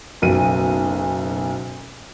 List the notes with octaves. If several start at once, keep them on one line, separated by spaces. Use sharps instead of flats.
F#1 B1 D#7